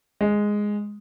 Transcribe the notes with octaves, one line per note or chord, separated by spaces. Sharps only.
G#3